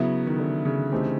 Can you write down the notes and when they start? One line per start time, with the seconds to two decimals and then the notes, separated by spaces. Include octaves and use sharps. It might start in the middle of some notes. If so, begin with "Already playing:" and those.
Already playing: C#3 F#3 B3 E4
0.27 D#3
0.39 D3
0.65 C#3
0.92 E3 A3 C4 D#4 G4